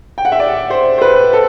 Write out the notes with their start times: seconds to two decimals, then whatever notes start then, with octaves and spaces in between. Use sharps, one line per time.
0.18 G5
0.25 F#5
0.32 E5
0.39 D5
0.70 C5
0.98 C5
1.01 B4
1.33 A4